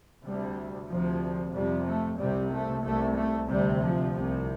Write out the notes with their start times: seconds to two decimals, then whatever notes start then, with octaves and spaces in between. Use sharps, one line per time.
0.24 D2 C3 G3
0.89 D2 C3 F3
1.54 F2 C3 G3
1.87 A3
2.19 C2 C3 G3
2.53 A3
2.84 C2 C3 A3
3.17 A3
3.49 D2 C3 G3
3.82 F3
4.14 C2 C3